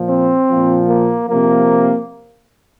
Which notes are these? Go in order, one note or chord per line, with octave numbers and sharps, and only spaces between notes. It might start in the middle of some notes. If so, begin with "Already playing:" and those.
Already playing: A#2 F3
C4
A#2 F3
A#3
C3 F3 A#3